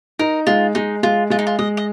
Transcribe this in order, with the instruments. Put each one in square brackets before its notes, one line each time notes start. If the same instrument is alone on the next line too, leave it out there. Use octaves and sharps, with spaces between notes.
[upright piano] D#4 [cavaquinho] A#4
[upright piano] G#3 [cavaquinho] F4
[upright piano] G#3 [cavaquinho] D#4
[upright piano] G#3 [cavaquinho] F4
[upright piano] G#3 [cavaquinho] F4
[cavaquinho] D#4
F4
[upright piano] G#3 [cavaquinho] D#5
[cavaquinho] D#5